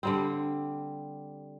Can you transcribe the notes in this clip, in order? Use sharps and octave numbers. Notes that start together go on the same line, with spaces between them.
D3 G3 C4